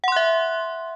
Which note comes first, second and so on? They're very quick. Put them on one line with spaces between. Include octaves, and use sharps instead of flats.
F#5 C6 F#6 E5